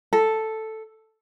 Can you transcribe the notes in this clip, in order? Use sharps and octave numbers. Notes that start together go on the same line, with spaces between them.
A4